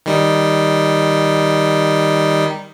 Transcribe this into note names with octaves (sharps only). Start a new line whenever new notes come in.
D#3 G3 D#4